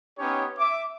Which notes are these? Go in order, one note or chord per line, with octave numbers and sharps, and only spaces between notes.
B3 C#4 D#4 G4 C#5
E5 D6